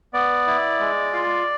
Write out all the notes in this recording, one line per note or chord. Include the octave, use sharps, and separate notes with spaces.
B3 D5
E4
G#3
F4